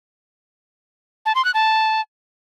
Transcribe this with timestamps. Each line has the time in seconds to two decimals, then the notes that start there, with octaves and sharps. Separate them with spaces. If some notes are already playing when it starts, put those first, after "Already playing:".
1.26 A5
1.35 C6
1.45 F#6
1.54 A5